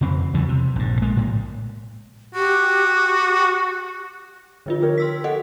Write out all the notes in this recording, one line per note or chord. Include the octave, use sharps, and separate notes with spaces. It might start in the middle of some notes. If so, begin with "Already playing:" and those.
F2 C#3 C4
E2 E3 F#3 G3
C3
A#1 G2
G#3 A#3
A2
F#4 G4
D3 F3 F4
G4 A#4 C#5
C6 E6 B6
F#4 A4 D#5 F#5